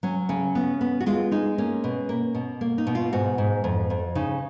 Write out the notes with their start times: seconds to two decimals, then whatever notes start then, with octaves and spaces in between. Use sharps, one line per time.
0.03 F#3 C#4
0.29 C#3 C#4
0.55 B3
0.81 B3
1.00 F#4
1.06 G#3 F4
1.31 G#3 D#4
1.58 A#3 C#4
1.84 B2
2.09 A#3
2.35 B2
2.61 A#3
2.78 D#4
2.87 B2
2.95 F4
3.13 G#2 F#4
3.38 G#2
3.64 F2
3.90 F2
4.15 C#3 D#4